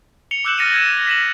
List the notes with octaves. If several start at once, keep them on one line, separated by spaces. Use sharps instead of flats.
C#7 F7 G7
D6 E6 F#6 G6 E7 F#7
F6 A6 A#6 C#7 D#7 F7
G#6 D#7 E7
B6 D#7 E7 F#7